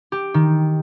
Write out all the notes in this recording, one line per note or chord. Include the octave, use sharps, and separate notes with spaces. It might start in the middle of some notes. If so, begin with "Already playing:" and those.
G4
D#3